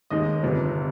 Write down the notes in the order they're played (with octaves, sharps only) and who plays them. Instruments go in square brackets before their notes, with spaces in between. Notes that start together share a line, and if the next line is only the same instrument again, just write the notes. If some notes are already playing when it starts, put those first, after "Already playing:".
[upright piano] D#2 D#3 G#3 D#5
G1 F2 C3 G3